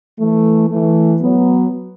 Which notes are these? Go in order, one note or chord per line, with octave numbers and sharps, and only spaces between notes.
E3 A3
E3 A3
F#3 B3